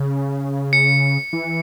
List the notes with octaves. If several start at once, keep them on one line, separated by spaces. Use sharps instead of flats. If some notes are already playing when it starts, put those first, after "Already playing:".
Already playing: C#3
C#7
E3